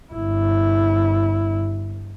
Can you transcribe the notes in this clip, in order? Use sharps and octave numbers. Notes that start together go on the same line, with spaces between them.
G1 E4